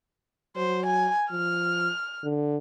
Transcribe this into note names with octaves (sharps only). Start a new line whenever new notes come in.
F#3 C5
G#5
F3 F6
D3